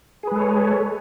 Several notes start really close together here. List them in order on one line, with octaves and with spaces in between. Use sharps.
G#4 B4 G#3 A4 C#5